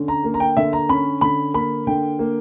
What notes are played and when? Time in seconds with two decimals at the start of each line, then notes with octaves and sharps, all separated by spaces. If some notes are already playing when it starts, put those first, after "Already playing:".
Already playing: D3 C#4
0.08 A#5
0.24 A#3
0.34 A#5
0.40 G5
0.57 D3 E5
0.73 A#5
0.89 C#4 B5
1.21 D3 B5
1.54 A#3 B5
1.87 D3 G5
2.19 A#3